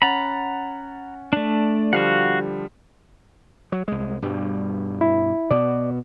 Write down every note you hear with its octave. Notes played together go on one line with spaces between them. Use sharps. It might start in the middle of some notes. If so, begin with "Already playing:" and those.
C#4 F#5 A#5 B5 A6
A3 D4 D5
D3 F3 G3 F#4 F5 F#5
F#3
C2 G#3
G2 B2 G3
E4
B2 B3 D5